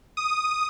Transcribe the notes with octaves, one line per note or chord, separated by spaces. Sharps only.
D#6